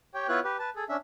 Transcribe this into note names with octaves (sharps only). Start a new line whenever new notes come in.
G4 C#5 G5
B3 E4 F4 B4 C#5 F#6
G4 B4
B4 A5
G#4 A4
C#4 D4 E5